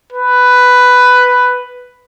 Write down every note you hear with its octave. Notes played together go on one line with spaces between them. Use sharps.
B4